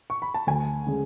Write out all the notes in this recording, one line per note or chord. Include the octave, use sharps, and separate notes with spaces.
C#6
B5
A5
D2 G#5
C#3 G#3